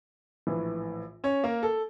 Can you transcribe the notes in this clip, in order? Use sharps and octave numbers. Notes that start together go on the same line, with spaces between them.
A#1 A2 E3
C#4 C#5
A#3 A#4
A4